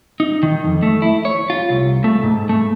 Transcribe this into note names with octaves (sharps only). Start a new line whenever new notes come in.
D#4
D#3
F2
A3
E4
C#5
F4
C2
A3
G#2
A3